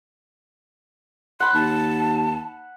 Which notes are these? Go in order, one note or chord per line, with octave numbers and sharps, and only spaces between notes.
F#5 B5 C6
D#2 A5